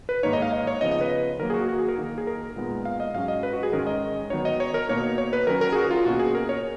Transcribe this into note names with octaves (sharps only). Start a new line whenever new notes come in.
B4
G#2 D#3 A#3 D#4 C#5
D#5
F5
D#5
C#5
C#3 F3 B3 D#4 D#5
D#5
B4
D#3 F#3 A#3 A#4
G#4
F#4
F#4
G#4
A#4
D#3 A#3 D#4
G#4
A#4
A#2 G#3 B3 D#4
F5
D#5
G#2 F#3 C#4 F5
D#5
B4
F#4
G#4
G#2 D#3 G#3 C#4 A#4
D#5
D#3 F#3 B3 D#4 C#5
D#5
C#5
A#4
B2 A#3 D#4 C#5
C#5
B4
D#3 F#3 C#4 A#4
A#4
G#4
F#4
F4
B2 A#3 C#4 F#4
G#4
A#4
C#5